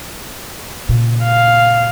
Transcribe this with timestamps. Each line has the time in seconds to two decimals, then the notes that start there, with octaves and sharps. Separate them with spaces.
0.89 A#2 C#3
1.24 F5